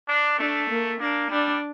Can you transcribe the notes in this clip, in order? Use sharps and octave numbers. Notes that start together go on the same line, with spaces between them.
D4
A3 D4
A#3
A#3 D4
G3 D4